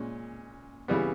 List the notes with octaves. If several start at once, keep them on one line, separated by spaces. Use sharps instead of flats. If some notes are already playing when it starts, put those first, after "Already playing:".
Already playing: A#2 G#3 C#4
C#3 E3 G3 B3